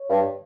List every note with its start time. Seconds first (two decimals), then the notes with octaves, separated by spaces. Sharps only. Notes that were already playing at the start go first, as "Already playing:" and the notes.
Already playing: C#5
0.09 G2